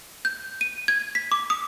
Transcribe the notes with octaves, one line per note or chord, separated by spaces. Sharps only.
G6
D#7
G#6
B6
D6
D#6